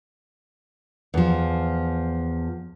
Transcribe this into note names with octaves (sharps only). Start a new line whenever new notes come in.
E2 F3